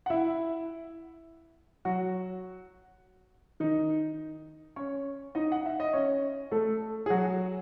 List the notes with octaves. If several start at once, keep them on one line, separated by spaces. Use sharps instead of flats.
F#5
E4 E5
F#3 F#4
D#3 D#4
C#4 C#5
D#4 D#5
F#5
E5
D#5
C#4 C#5
A3 A4
G#4
F#3 F#4